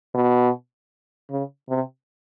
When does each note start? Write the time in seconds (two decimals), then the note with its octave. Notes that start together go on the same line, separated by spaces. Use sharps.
0.15 B2
1.30 C#3
1.69 C3